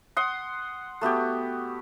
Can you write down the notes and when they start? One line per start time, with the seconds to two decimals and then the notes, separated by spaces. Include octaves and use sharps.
0.17 F#5 C6 D#6
1.01 A3 B3 F#4 G4